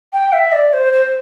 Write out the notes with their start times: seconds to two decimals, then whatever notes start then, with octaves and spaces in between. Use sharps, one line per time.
0.13 G5
0.32 E5
0.52 D5
0.73 C5
0.93 C5